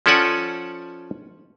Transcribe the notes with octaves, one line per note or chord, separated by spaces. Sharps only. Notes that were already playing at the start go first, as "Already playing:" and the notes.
F3 C#4 A4 D5 F#5 G#5